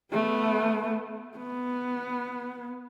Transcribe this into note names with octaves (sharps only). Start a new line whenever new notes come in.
A3 B3
B3